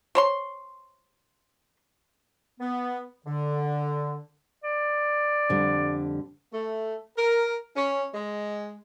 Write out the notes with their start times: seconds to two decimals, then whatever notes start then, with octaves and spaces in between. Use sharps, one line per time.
0.15 C5 C#5 C6
2.61 B3
3.27 D3
4.64 D5
5.49 F2 D3 G3
6.54 A3
7.17 A#4
7.76 C#4
8.14 G#3